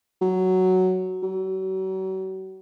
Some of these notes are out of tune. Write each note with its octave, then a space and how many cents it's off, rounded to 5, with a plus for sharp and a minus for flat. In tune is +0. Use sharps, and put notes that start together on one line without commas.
F#3 +5
F#3 +40